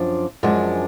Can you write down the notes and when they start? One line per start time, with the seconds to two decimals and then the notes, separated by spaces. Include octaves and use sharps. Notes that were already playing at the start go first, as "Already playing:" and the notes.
Already playing: F#2 F3 D4
0.43 F#2 F3 G#3 D4